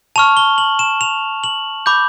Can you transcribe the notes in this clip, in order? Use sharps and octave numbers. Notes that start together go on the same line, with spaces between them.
A5 C#6 F6 F7
G7
F#7
E7
F7
F#7
B5 D6 G6